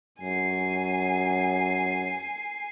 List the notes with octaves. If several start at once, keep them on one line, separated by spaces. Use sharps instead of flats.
F#2 G#5 C7